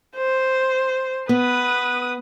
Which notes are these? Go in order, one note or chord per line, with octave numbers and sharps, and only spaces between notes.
C5
B3 B4 D#6